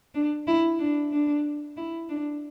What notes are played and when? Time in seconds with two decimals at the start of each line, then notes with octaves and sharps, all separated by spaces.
0.14 D4
0.47 E4
0.79 D4
1.12 D4
1.77 E4
2.09 D4